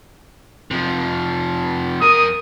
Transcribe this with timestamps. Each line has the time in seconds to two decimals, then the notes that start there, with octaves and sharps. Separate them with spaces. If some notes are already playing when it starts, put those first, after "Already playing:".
0.71 C3 F3
2.02 F2 A#4 D#6